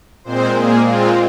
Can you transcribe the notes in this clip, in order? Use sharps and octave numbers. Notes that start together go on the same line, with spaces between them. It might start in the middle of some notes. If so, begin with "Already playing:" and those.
A#2 G#3 C4 C5
A#2 A#3 G#4
A#2 G#3 C4 F4